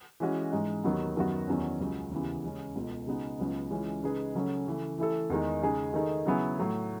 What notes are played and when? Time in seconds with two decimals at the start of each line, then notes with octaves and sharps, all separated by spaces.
0.20 E3 G#3 C#4 F#4
0.52 G#2 E3 G#3 D#4
0.84 D#2 D#3 F#3 B3
1.16 F#2 D#3 F#3 B3 F#4
1.48 E2 D#3 F#3 C#4
1.80 C#2 C#3 F#3
2.12 D#2 C#3 E3 B3
2.44 C#3 G#3 C#4
2.75 C#2 B2 A3
3.07 C#3 G#3 B3 D#4 F#4
3.39 C#2 C#3 F#3 B3
3.71 C#2 C#3 E3 G#3 C#4
4.03 C#3 G#3 D#4 G#4 B4
4.35 C#3 F#3 A3 C#4
4.67 C#3 E3 A3
4.98 E3 A3 E4 A4
5.30 E2 D#3 G#3 D#4
5.62 C#3 G#3 D#4 G#4
5.94 D#3 A3 D#4 G#4
6.26 C#3 F#3 B3 E4 G#4
6.57 A2 F#3 A3